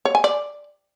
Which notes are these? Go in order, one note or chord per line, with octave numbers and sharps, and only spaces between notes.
C#5
G#5
D5